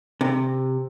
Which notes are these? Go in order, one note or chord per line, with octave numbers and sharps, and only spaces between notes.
C3